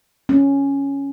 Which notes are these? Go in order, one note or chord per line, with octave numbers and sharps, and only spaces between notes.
C#4